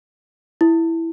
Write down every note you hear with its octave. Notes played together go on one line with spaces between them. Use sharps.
E4